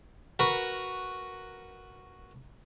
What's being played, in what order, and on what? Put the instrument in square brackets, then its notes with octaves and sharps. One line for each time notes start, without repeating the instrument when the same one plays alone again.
[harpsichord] F#4 A#4 B4 A#5 B5 C#6